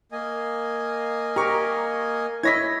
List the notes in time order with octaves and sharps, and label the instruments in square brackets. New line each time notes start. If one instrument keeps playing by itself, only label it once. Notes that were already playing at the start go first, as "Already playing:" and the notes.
[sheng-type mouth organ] A#3 D#5 G#5
[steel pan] G4 A#4 [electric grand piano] A#5 C#6
[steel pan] E4 C#5 D#5 [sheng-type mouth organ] C#6 [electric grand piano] G#6 A#6 B6